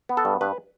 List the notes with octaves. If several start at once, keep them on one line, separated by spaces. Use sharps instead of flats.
B3
A4
G2
G2 B4